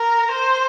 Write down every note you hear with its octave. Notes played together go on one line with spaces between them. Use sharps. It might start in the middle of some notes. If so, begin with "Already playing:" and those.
Already playing: A#4
C5